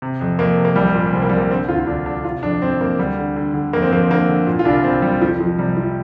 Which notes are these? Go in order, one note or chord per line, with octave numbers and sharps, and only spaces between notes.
C3
F2
F2 A#3
C3
A#3
C2 G3
A#2
C2 C4
A#3
C2 G3
A#3
D3 C4
D2 F4
F4
D2 D4
D3 D4
C3 F4
F2 D4
F2 C4
F2 A#3
D2 G3
D3
D3
D3
F2 A#3
C4
F2 A#3
C4
D3 A#3
D3
A#2
F4
C2 D4
C2 C4
C2 G3
F2 F3
F2 F3
C3 G3
C3 F3